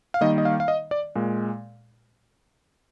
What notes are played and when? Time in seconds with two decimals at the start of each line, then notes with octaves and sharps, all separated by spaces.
0.14 F5
0.21 D#3 G3 A#3 D#5
0.38 D#5
0.45 F5
0.60 F5
0.68 D#5
0.91 D5
1.15 A#2 G#3